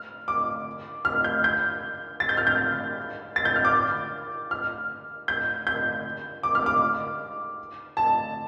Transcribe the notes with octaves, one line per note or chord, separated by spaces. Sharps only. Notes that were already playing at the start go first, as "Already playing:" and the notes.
Already playing: F6
D6
F6
G6
G6
A6
G6
F6
G6
A6
G6
F6
D6
F6
G6
G6
D6
F6
D6
A5